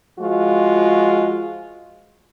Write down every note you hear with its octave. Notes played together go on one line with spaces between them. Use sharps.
F3 G#3 F4 F#4